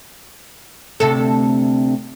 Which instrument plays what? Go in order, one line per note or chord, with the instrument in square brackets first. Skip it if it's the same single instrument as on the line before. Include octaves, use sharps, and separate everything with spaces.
[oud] D2 C3 A4